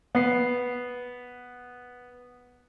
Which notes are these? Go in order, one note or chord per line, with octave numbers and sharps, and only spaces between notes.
B3 C7